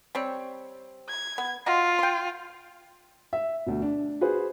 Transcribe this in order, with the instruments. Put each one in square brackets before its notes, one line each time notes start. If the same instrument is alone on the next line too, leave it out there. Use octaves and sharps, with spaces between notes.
[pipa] G3 C4 C#5
[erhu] G#6
[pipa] B3
[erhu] F4 [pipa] F#4 D#5 F5
[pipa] G5 C6
[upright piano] E5
D2 B2
D4
F#4 G#4 B4 C5